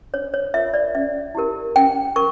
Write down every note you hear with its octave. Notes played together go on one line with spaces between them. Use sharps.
D4 C#5
C#5
F4 A#4 C#5 E5
D5
C#4 E5
E4 G4 A#4
C#4 G5
A#4 C#6